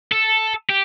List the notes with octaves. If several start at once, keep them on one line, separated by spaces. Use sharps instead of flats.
A4
G4